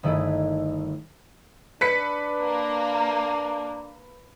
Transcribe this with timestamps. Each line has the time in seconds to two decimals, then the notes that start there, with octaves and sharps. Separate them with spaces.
0.03 G1 D#3 A3 E4 G#4
1.81 D4 B4 B6 C#7
2.42 A#3